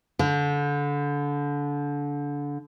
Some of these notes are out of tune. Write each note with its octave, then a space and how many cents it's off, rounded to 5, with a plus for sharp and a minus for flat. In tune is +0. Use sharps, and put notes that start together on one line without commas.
D3 -25